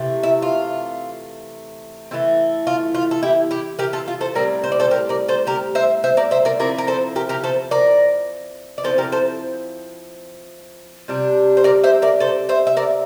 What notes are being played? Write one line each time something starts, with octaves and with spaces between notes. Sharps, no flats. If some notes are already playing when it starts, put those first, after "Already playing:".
Already playing: C3 E3 A3
E4
F4
E3 A3 C4 E4
F4
F4
A4
E4 G4
E4 G4
G4 A#4
F4 A4
F4
A4 C5
A2 G3 C4 A#4 D5
C5
D5
A4 C5
G4 A#4
A#4 D5
A4 C5
G4 A#4
C5 E5
C5 E5
A#4 D5
C5 E5
A#4 D5
F3 C4 E4 A#4 D5
A#4
A4 C5
G4 A#4
G4 A#4
A4 C5
A#4 D5
D5
F3 C4 E4 A4 C5
G4 A#4
A4 C5
C3 G3 D4
C5
A#4 D5
C5 E5
A#4 D5
A4 C5
C5 E5
E5
A#4 D5